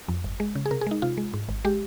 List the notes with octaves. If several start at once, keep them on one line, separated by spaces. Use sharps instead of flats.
F2
G1
G#3
C#3
G#4
C3 A#4
G#4
G#3 D#4
C3 F4
G#3
G#2
G#1
G#3 G4